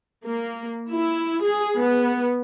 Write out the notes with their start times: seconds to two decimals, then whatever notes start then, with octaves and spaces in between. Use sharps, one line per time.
0.24 A#3
0.89 E4
1.43 G#4
1.77 B3